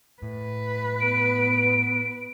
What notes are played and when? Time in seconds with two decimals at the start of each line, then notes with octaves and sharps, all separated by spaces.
0.23 A2 B4
1.00 B3 D7